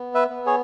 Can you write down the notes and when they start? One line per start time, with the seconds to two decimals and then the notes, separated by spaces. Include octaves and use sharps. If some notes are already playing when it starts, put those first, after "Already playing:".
Already playing: B3
0.14 B4 E5
0.30 B3
0.46 G#4 C#5